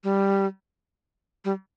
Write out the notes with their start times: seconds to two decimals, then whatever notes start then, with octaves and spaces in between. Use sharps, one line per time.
0.04 G3
1.45 G3